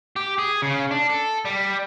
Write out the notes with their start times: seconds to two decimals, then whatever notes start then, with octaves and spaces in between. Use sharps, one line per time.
0.16 G4
0.39 G#4
0.62 C#3
0.91 D4
1.10 A4
1.45 G3